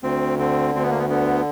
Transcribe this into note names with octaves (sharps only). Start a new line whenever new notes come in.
D2 C4
D3 C4
D2 C4
B3
A#3
B3
D3 B3